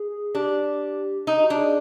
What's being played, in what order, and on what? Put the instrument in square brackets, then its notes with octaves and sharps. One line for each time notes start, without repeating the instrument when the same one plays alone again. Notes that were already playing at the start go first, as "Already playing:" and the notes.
Already playing: [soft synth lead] G#4
[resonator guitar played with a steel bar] D4 [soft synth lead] G4
[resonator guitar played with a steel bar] D#4
[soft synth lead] F#4
[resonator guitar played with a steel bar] D4 [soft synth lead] G4
[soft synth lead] G#4